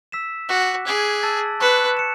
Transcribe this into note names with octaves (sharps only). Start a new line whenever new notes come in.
E6 B6 E7
F#4 D6 F#6 B6
G#4 D6 G#6 B6 D7 F#7
A5 E6 A6
B4 A5 C#6 F#6 C#7 E7
C#7 E7